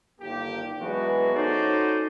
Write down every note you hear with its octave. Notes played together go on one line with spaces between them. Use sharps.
G1 G2 D#3 A#3 G4
E3 F#3 G#3 B3 D4 F#4
C#4 D#4 F#4 A4 C5 D5